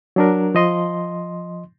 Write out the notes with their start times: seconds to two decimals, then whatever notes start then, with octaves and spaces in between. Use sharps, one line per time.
0.16 F#3 D4 A#4
0.55 F3 D#5 C6